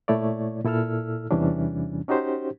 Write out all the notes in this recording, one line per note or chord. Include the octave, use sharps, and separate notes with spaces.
A#2 A3 E4 C#5 D5
A#2 E4 A4 E6 F6
E2 C3 E3 G3 C#4 D4
C#4 D#4 F#4 G4 C5